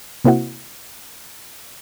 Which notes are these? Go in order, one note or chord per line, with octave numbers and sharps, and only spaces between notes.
C3 A#3 C4 E4 F#4